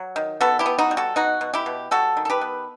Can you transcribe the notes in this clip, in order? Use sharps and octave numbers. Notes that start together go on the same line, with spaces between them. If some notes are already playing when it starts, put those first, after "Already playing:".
Already playing: F#3
D#3
B3 F#4 A4
E4 G4
B3
D#4 F#4
G3
F#4 A4
B2 D#4 F#4
B2
E4 G4
B2
G3 F#4 A4
D#3
A4
G4 B4
B3